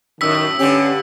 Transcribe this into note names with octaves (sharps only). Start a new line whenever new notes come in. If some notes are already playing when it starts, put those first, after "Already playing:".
F#2 A2 D#3 E6 B6
G2 D3 C#4 G4